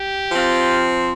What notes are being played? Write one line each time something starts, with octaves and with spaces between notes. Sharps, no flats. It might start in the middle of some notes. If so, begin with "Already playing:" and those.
Already playing: G4
F3 C4 F4